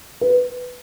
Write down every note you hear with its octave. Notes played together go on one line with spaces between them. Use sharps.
B4